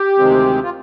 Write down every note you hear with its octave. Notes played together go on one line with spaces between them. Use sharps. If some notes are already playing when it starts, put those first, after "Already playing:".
Already playing: G4
D2 C3 D#3 G#3 C4
F4